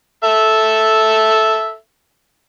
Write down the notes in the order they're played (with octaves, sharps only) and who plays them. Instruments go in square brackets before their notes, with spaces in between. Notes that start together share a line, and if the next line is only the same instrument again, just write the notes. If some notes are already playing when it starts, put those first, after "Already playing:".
[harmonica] A4 E5